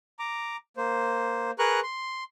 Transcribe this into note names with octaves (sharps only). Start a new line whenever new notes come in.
A#5 D6
A#3 C5
G#4 A#4 B4 A#5 C#6 F#6
C6